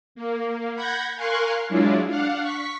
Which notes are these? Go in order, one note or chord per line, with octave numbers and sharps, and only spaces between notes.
A#3
F#5 B5 G6 G#6 A#6
A#4 F5 G#5 C6 C#6 F#6
F#3 G#3 D4 E4 F4
D4 F5 F#5
C#6 B6